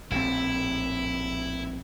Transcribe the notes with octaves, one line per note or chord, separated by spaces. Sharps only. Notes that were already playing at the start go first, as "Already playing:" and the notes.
A#1 A2 C4 E4